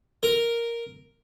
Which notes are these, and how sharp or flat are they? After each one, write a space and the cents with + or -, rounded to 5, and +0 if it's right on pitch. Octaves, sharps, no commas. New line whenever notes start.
A#4 +0